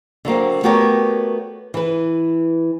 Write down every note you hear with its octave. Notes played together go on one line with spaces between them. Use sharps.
D3 F#3 A#3 C4
A3 B3 F#4 G4 A#4 C#5
E3 B4